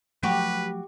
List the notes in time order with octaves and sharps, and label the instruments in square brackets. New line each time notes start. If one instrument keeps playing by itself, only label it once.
[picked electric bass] F3 F#3 A3 [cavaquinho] F#4 C#6 D6 [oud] G4 [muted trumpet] B4